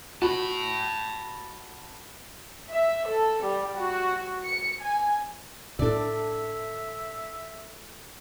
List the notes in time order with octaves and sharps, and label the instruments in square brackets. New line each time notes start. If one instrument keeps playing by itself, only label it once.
[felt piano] F#4 [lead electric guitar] A5 B5
[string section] E5
A4
G3
F#4
C#7
G#5
[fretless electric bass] A2 D4 [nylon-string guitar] A4 D5 [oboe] E5